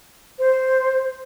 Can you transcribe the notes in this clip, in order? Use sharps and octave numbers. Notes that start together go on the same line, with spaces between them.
C5